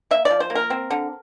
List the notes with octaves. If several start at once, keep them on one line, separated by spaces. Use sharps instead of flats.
A#3 E5
D5
F3
C5
A#3
A#4
C4
D3